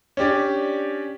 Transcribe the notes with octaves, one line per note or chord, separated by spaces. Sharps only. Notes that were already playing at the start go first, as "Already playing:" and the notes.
C#4 D4 G4 D5